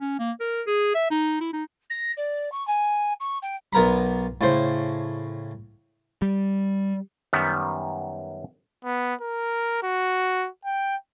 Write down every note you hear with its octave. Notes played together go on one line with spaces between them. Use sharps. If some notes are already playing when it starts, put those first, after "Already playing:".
C#4
A#3
A#4
G#4
E5
D#4
E4
D#4
A#6
D5
C#6
G#5
C#6
G5
B1 B3 A#4 A#5 B5
A2 C#3 C5
G3
F#2 D#3 G3 B3
B3
A#4
F#4
G5